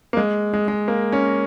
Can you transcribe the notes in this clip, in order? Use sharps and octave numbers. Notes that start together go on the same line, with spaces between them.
A#3
G#3
G#3
G#3
A#3
C#4